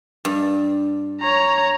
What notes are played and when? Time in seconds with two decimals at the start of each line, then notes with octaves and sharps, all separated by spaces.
0.25 G2
1.21 C#5 A#5